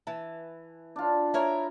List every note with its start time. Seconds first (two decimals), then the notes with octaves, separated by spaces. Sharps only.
0.07 E3 A5
0.96 D4 F4
1.34 E4 A#4 C#5